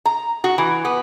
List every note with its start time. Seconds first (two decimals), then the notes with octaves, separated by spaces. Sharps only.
0.05 A#5
0.44 F#4
0.58 E3
0.85 B3